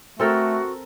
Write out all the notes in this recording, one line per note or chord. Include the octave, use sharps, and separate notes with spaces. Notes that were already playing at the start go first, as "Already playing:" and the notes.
A3 C4 F#4 A4 A#4